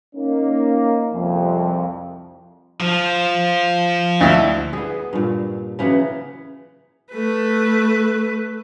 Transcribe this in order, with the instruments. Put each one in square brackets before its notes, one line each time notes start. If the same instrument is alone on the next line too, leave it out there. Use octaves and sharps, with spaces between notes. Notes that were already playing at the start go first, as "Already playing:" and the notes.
[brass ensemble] A#3 C#4 D#4
C2 F2
[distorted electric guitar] F3
[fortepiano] D2 E4
[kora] B3 G#4
G2 A#2
C#3 E3 F#3 B3
[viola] A3 B4